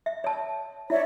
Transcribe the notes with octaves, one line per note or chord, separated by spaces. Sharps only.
E5
C#5 A5
E4 C#5 D5 E5